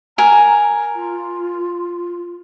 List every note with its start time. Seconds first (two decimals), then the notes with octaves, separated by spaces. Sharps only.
0.18 A#4 G#5 A#5
0.96 F4